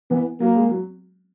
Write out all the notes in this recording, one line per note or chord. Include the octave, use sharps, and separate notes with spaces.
E3 B3
F#3 A#3
G#3
F#3